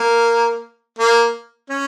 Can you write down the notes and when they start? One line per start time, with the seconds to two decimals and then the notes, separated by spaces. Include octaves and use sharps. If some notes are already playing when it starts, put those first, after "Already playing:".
Already playing: A#3
0.99 A#3
1.70 C#4